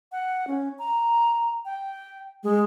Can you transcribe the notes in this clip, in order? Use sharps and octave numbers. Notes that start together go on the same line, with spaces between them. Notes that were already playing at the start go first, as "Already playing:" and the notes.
F#5
C#4
A#5
G5
G#3